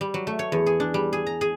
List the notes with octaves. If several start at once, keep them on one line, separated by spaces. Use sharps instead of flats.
G3
F#3
A3
C#5
E2
G#4
D4
G3
G#4
A#5
G#4